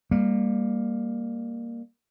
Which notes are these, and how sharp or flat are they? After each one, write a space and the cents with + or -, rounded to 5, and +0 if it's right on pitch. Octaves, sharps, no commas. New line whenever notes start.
G3 +30 A#3 +0